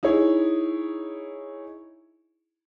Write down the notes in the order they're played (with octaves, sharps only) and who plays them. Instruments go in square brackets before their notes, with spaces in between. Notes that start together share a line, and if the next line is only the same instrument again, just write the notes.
[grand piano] D#4 E4 G#4 C#5